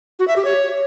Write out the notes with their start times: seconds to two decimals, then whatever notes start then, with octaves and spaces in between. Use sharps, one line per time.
0.19 F#4
0.28 E5
0.36 G4
0.45 C#5